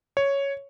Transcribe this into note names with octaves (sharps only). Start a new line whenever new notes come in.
C#5